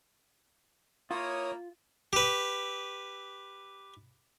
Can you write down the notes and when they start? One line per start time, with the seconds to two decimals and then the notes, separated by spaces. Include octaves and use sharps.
1.11 A#3 E4 F4 A#4 C#5 D#6
2.13 G4 B4